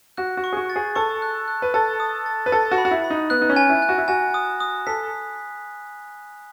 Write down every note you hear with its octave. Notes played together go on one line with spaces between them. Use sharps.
F#4 F#6
F#4
C#6
G#4
F#4
A6
G#4
A4 C#6
F#6
F#6
B4
A4 A6
D#6
A6
B4
A4 A6
F#4
B5
F#4
E4
B5
D#4
B3 F#6
D#4
C#4
G#5
E4
F#6
F#4
E4
F#4 G#5
D#6
D#6
A4 B6